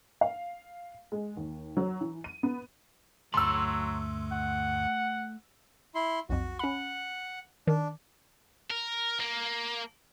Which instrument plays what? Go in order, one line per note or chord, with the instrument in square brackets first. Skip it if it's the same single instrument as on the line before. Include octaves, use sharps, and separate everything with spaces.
[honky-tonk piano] F5
G#3
D#2
F#3
E3
D#7
B3
[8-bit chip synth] D2 G2 D3 [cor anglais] F#3 [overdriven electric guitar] A3 B5 [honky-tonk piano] C6 E6
[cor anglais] F#5
[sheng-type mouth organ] E4 C6
[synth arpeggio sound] B1 F2 [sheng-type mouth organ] F#4
[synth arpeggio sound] C#4 B5 [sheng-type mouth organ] F#5
[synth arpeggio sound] D#3 [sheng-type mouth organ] D4
[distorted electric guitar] A#4
A#3